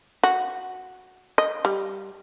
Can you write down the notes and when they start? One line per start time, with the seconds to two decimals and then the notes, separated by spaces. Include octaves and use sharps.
0.24 F#4
1.38 D#5
1.65 G3